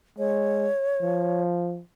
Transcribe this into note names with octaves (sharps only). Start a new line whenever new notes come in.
G#3 C#5
F3